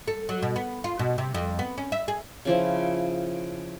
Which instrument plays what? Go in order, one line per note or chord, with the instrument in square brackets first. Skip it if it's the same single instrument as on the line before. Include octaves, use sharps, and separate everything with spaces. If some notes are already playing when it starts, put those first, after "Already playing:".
[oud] A4
F#3
B2
B3
F4
B2
C3
F2
B3
C#4
E5
G#4
[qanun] C#3 F3 E4